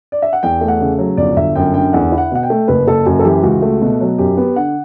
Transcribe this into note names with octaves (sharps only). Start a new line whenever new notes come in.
D5
E5
F#5
E2 G5
A3
F#5
C#3
F#3
G1 D5
G1 E5
F#2 G5
D3 G5
E2 F#5
E4
F#5
B2 F#5
G5
A3
F#1 B4
F#1 A4
F#2 F#4
A4
E3 G4
C#2 F#4
A3
B2
F#3
F#2 G4
B3
D3 F#5